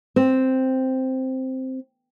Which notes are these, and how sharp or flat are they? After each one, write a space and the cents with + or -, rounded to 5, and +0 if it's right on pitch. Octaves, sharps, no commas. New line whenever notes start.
C4 +0